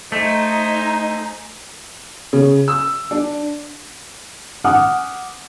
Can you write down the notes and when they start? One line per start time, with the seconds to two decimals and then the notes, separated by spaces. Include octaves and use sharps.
0.12 A3 D#4 C5 G#5
2.33 C#3
2.68 E6
3.11 D4
4.64 F#5 G#5 D6 D#6 F6